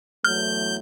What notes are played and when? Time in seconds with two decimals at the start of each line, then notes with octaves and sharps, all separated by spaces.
0.24 E2 F#3 A3 F6 G6